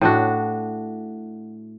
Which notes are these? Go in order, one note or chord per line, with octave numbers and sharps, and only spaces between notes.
A2 D4 F#4